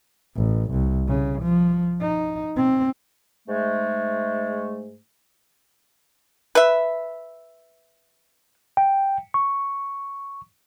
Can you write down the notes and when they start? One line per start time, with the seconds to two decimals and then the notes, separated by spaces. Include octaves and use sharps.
0.36 A1
0.71 C2
1.07 C#3
1.42 F3
2.01 D#4
2.56 C4
3.48 G#2 G#3 A3
6.55 B4 E5
8.77 G5
9.34 C#6